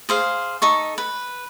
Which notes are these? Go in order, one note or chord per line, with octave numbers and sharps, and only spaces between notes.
G#4 C5 F5
D#4 A4 C#6
B4